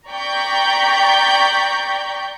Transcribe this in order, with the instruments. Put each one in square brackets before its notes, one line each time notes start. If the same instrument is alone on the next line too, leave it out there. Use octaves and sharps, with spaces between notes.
[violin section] D5 G5 A#5 C#6 G6 B6